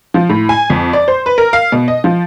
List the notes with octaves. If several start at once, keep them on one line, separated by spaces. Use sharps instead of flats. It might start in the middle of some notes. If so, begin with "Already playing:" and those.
F3
A2
G#5
F2
D5
C5
B4
A#4
F5
B2
D#5
F3